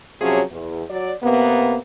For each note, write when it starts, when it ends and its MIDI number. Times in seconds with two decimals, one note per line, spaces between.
0.21 0.42 48
0.21 0.42 53
0.21 0.42 54
0.21 0.42 61
0.21 0.42 68
0.51 0.82 40
0.90 1.12 54
0.90 1.12 74
1.22 1.77 48
1.22 1.77 58
1.22 1.77 59